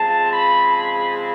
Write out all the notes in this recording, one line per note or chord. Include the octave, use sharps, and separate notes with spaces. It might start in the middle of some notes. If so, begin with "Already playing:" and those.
Already playing: C#3 F3 G#3 C4 A5
B5
B5